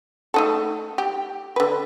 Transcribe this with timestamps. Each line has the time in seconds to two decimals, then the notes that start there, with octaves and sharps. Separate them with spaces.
0.34 A3 D#4 A4
0.98 G4
1.56 D3 B4